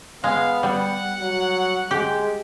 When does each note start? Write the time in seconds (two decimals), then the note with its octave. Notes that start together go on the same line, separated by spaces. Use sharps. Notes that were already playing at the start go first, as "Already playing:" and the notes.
0.24 G#3 B3 F5
0.63 G3 F#5
1.20 F#3
1.91 G#3 G4